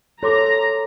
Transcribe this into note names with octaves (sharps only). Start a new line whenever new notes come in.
A4 C#5 A#5 C6 D6